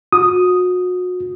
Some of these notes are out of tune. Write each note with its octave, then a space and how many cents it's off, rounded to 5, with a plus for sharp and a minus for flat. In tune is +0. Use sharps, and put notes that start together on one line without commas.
F#4 -35 D#6 +0